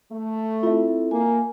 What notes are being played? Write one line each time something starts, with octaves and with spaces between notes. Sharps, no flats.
A3
C4 E4 F4 A4 E5
A#3 G#5